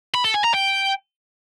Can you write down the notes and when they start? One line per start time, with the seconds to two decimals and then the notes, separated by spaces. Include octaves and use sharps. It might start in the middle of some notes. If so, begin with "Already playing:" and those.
0.15 B5
0.25 A4
0.34 G#5
0.44 A#5
0.54 G5